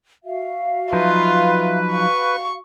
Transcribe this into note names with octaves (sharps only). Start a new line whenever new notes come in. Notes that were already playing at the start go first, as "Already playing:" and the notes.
F#4 E5 F5
F3 F#3 D#4 F4 B4
F#4 F5 C#6